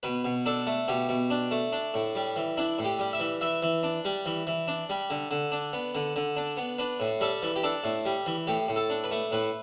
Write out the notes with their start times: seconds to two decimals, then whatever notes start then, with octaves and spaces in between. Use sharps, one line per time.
0.03 B2 B4
0.24 B2
0.46 D4 A4
0.67 A3
0.88 B2 G4
1.09 B2
1.30 D4
1.51 A3
1.72 D4
1.94 A2
2.15 G3
2.36 E3
2.57 D4 E4
2.79 A2
2.84 G4
2.99 G3
3.13 E5
3.20 E3
3.41 E3 E5
3.62 E3
3.83 D4
4.05 G3
4.26 E3
4.47 E3
4.68 D4
4.90 G3
5.10 D3
5.31 D3
5.52 D4
5.73 B3
5.95 D3
6.16 D3
6.36 D4
6.57 B3
6.78 D4 B4
7.00 A2
7.20 G3 A4
7.43 E3
7.56 G4
7.63 D4 A4
7.84 A2
8.05 G3
8.26 E3
8.47 A2 G4
8.68 A2
8.76 A4
8.90 D4
9.04 B4
9.11 A3
9.31 A2 B4